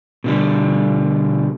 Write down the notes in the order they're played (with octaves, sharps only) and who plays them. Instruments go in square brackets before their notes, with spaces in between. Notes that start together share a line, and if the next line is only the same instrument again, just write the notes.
[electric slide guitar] B2 D3 G3